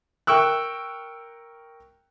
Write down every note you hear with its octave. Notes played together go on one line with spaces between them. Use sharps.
A#4 G5 C#6 E6 F#6